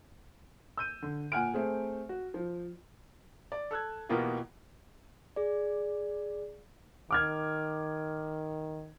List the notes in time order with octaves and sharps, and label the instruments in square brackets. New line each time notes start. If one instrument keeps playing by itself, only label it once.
[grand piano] E6 G6 D#7
D3
A#2 F#5 G#5 F6 D7
A3 C4 G#4
F#4
F3
[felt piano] D5
A4 E6 F#6 G#6
B2 E3 A#3 B3 F4 G4
[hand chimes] G#4 D5
[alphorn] D#3 [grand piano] D6 F6 G#6